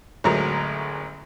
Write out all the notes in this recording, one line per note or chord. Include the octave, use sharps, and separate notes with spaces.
A1 D2 F#3 G#3 A#4 A#5